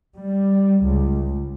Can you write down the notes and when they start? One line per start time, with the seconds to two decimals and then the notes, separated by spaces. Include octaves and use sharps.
0.16 G3
0.83 C#2